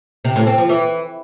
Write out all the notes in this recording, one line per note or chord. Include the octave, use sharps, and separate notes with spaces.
C3
A2
C4
F3
E3